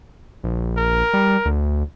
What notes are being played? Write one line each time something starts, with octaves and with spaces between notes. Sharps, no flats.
A#1
A#4
G3
D2